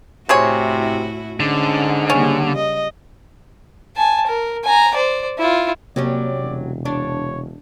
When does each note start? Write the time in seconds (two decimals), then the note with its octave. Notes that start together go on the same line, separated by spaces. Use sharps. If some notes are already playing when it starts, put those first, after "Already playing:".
0.29 A2 C3 C4 E4 F#4 G#4 C#5
1.40 G#2 D3 C#4
2.10 C#3 G3 A#3 C#4
2.54 D#5
3.96 G#5 A5
4.27 A#4
4.64 G#5 A#5
4.94 C5 D5
5.39 E4 F4
5.96 C3 F#3 G3 A#3 C#4 D5
6.38 E1
6.85 D4 C#5